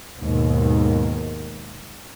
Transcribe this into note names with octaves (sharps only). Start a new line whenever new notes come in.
D#2 G#2 B2 D#3